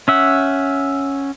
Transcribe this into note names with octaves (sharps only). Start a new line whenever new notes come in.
C#4 E5 F#5